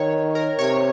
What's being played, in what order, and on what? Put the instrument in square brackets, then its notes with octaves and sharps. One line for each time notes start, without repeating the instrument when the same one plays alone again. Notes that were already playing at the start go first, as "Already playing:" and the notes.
Already playing: [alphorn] D#3 [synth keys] C#5
[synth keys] A#4
[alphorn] C3 [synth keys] C#5